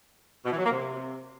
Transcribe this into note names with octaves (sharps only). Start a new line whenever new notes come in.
B2
E3
F#3
A#3
C3